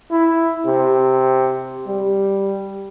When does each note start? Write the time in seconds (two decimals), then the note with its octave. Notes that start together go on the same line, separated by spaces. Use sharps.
0.11 E4
0.66 C3
1.87 G3